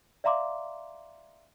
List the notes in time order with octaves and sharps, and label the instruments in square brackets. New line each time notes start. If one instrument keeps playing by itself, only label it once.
[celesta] D5 E5 F5 A#5 C6 D6